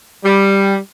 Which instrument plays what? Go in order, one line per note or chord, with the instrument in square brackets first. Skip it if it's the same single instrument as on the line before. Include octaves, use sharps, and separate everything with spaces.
[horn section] G3